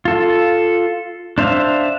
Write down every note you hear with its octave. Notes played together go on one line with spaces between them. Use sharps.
F4 A4
D4 C5 E5 F5